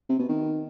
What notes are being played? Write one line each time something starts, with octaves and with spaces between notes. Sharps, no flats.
C3
B2
D#3